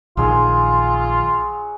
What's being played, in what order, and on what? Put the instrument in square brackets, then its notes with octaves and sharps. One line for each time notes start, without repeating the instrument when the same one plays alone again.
[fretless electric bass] A#1 D#3 [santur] F#3 G#3 G#4 [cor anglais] F4